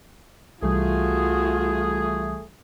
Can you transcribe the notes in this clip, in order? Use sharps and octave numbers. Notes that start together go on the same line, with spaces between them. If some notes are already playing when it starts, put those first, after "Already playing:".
C2 E3 G3 A3 F4 F#4 G#4